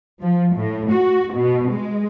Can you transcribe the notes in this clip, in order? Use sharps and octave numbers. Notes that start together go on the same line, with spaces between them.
F3
A2
F#4
B2
G#3